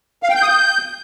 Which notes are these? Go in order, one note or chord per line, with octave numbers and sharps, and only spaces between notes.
F5
G5
G6
D#6
G6